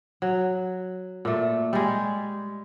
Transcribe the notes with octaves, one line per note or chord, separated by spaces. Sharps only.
F#3
A#2 A3
G3 G#3